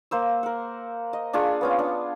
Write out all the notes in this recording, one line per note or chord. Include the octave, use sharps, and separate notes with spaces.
A#3 C5 E6
A#4 F#5
D#5
D4 F4 G#4 C#6
B3 C#4 F4
D4